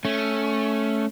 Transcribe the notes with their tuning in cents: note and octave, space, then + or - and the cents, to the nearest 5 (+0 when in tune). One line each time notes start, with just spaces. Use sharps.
A3 -5 C#4 +0